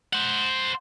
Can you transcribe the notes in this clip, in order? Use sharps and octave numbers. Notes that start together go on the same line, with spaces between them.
C5 F#5